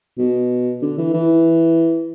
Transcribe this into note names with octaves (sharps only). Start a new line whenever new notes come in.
B2
D3
E3
E3